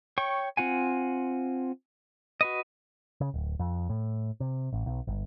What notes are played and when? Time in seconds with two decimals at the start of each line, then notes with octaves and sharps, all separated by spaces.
0.18 C#5 G5 C#6
0.57 C4 F4 F#5 G#5
2.41 F#4 B4 D#5
3.21 C#3
3.34 D1
3.59 F2
3.89 A2
4.40 C3
4.72 A1
4.86 B1
5.07 G1